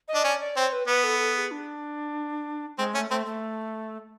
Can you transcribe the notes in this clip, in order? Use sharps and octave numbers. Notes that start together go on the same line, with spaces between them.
D#5
D4
C#4 D5
D5
C4 C#5
B4
B3 B4
A4
A4
G#4
D4
G#3 C4
A3 C#4
A3 C4
A3